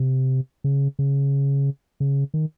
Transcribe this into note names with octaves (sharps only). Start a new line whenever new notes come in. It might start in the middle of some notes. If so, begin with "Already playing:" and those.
Already playing: C3
C#3
C#3
C#3
D#3